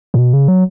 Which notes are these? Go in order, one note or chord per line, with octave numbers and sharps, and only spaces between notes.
A2
B2
C#3
F#3